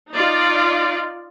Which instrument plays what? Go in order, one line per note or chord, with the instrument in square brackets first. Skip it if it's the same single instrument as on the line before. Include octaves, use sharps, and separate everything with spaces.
[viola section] D#4 F4 D5